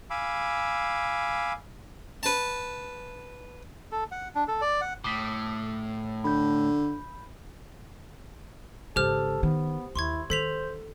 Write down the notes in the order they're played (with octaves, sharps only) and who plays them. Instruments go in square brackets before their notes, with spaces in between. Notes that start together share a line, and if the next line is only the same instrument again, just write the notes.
[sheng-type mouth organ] F5 G#5 B5 D6 E6
[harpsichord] B4 A5
[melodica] A4
F#5
D4
A4
D5
F#5
[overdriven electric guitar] A2 [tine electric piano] D6 D#6 B6
[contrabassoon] D3 [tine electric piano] B5 G6
[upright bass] G#1 C#3 [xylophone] G4 C5 F6 [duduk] A4
[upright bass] D#3 [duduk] B3
[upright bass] D#2 [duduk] E4 [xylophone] C6 C#6 G#6
[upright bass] D#3 [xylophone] A4 B6 F7 [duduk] C5